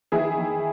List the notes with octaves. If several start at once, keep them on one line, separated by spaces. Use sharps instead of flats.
D#3 E4 G#4
D#3